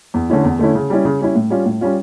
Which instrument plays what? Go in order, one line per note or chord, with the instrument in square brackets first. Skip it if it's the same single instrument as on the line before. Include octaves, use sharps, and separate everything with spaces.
[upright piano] E2
D3 A3 C#4 E4
E2
D3 A3 C#4 E4
C#3
G3 C#4 E4
C#3
G3 C#4 E4
A2
G3 C#4 F4
A2
G3 C#4 F4